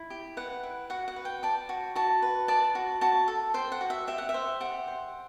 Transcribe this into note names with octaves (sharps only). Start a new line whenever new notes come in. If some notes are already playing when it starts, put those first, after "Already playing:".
Already playing: E4
G4
B4 F#5
E4
F#4 F#5
F#5
B4
G5
D5 A5
F#4
F#4 A5
B4
D5 A5
F#4
F#4 A5
A4
C5 G5
F#5
F#4
E5
G4 E5
F#5
E5
C5
G4 F#5
C5